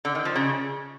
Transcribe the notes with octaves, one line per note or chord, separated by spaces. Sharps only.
D3
D#3
F3
C#3